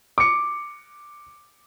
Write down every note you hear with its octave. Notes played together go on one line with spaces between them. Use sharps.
D6 C#7